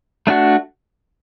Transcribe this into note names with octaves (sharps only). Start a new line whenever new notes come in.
A3 D4 F#4